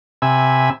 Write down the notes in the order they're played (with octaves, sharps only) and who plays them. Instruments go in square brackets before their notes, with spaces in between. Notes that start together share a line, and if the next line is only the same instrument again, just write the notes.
[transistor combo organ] C3 E5 G#5 B5